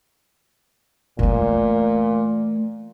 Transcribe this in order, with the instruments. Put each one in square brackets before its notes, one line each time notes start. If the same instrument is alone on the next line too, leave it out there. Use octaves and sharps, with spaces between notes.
[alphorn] A#2 [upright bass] E3 A3